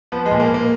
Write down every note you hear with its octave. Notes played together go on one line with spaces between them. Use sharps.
F3 B3
G#3
A#2
A#3
A#2
A#3